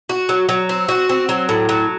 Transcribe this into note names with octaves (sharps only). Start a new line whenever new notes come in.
F#4
F#3
F#3
C4
F#4
C4
F#3
A2
F#3